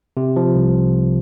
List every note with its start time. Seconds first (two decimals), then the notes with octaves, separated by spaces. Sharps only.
0.17 C3
0.36 F3
0.55 C2